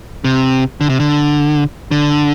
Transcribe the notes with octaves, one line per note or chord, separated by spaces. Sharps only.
C3
D3
C3
D3
D3